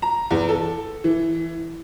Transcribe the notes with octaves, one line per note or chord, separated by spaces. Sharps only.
A#5
E2
A4
E3